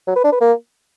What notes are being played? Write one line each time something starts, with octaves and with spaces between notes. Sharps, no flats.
F#3
B4
D4
B4
A#3